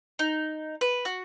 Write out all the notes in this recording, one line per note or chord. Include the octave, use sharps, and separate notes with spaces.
D#4
B4
F#4